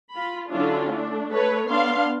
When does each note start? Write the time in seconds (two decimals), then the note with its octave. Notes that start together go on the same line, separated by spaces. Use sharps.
0.13 F4 B5
0.49 D3 F#3 C#4 D4 E4 F4
0.90 A3 D4
1.32 A3 A4 B4 C#5
1.68 B3 D4 F5 C6